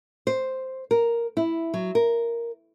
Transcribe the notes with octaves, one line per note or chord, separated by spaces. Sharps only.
C5
A#4
E4
F#3
A#4